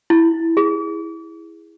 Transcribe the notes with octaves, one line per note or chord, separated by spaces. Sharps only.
E4
G#4